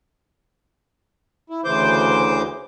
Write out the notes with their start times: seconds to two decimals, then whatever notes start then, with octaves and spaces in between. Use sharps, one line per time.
1.50 E4
1.65 D2 C#3 E3 C5 D6 G6